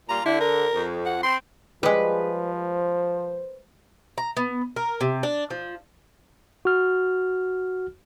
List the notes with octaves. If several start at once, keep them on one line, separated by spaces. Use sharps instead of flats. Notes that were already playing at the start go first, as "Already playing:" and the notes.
A#2 G3 F4 A#5
D3 E4
A#4
F2
F#5
C4 C6
F3 G3 G#3 G#4 B4
C5
A#5
B3
A#4
C3
D4
F3
F#4 F6